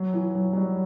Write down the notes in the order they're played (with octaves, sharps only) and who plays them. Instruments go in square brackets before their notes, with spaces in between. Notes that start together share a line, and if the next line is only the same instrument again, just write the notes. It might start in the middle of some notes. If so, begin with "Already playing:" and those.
Already playing: [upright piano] F#3
E3
F#3
F#3
G3